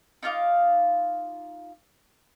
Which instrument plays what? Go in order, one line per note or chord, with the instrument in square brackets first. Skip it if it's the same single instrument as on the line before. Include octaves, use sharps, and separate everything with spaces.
[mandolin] D#4 F4 F5 D6